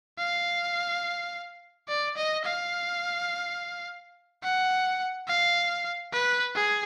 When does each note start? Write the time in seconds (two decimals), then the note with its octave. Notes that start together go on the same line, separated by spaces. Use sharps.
0.19 F5
1.88 D5
2.17 D#5
2.45 F5
4.43 F#5
5.28 F5
6.13 B4
6.55 G#4